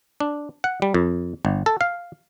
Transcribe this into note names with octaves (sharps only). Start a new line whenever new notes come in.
D4
F#5
G3
F2
G1
A4
F5